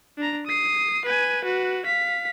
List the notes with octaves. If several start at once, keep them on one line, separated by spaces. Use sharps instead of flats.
D4 A#5
D#6 C7
B4 G#5
F#4 B4
F5 B6